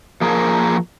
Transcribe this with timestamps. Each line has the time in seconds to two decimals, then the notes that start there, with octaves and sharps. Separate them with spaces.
0.21 F3 A#3 G#4 A#4